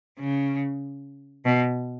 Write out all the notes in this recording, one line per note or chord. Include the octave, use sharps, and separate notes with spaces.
C#3
B2